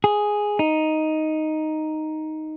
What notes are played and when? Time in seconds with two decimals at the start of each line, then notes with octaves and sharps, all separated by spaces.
0.04 G#4
0.59 D#4